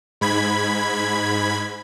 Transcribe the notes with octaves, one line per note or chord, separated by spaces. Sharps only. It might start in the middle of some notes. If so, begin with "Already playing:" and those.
G#2 B5 G#6